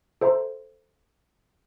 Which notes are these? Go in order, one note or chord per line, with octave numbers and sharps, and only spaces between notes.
A4 C5 E5 A#5 C6